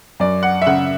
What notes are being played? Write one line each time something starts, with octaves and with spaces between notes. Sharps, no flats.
F#2 D5
F#5
E5
C#3 F#5